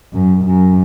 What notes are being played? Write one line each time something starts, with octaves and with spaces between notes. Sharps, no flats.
F#2
F#2